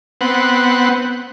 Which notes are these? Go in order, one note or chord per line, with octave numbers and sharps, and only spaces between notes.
B3 C4 F#5